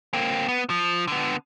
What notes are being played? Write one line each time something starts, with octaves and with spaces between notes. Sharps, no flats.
A#3 C4
B3
F3
D3 B3